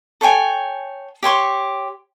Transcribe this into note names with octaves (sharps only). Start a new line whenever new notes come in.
A4 C#5 G5 G#5
G4 C#5 C6 C#6